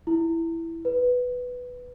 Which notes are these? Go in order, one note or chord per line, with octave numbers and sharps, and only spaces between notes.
E4
B4